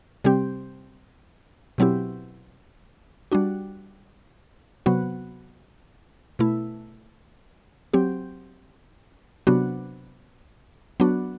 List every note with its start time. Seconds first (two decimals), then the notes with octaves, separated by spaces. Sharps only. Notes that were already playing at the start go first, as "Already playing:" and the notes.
0.24 C3 G3 C4 G4
1.78 B2 F#3 C4 E4 G4
3.32 G3 D4 F#4
4.86 C3 F#3 B3 F#4
6.39 B2 A3 E4
7.93 F#3 C4 G4
9.47 C3 F#3 B3 D4 F#4
11.00 F#3 B3 D4 F#4